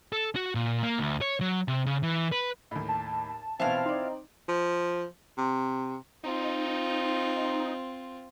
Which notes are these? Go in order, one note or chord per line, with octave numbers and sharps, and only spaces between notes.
A4
F#4
A#2
A#3
D2
C#5
F#3
C3
C#3
E3
B4
D#2 A2
A5
B2 E3 C4 E4 F4 F5
D#4 D5 C6
F3
C3
C4 D#4 F4